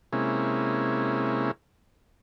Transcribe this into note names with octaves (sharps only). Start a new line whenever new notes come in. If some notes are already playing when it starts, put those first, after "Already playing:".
C3 G#3 A#3 C#4 E4